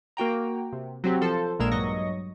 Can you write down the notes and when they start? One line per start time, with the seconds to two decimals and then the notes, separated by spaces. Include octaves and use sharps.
0.17 A#3 F#4 G5 A#5
0.73 C3
1.04 F#3 C4 G4
1.21 F3 A4 C5
1.59 A#1 A#2 G#3 A#4 E6
1.72 G2 F#3 D#5 C#6 A#6